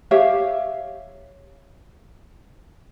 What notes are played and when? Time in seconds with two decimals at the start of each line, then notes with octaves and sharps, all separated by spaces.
0.11 G4 C#5 E5 F5